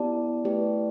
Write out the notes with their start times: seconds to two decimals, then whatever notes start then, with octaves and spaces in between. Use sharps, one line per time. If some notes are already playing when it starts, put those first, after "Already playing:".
Already playing: B3 E4 G4 D5 A5
0.45 A3 E4 G4 B4 D5